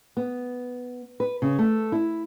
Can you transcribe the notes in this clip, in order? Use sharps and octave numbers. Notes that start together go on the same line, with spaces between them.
B3
B4
C#3
A3
E4